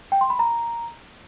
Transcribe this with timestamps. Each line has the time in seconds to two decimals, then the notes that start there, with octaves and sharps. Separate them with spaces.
0.12 G5
0.21 C6
0.30 B5
0.39 A#5